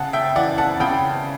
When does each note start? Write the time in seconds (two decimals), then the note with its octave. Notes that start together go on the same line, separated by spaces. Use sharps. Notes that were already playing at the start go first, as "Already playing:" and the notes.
Already playing: C#3 F#5 A5
0.13 E5 G5
0.36 E3 D5 F#5
0.58 F#5 A5
0.80 C#3 G5 B5